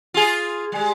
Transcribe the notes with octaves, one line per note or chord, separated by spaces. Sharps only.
F4 G#4
G3 G#3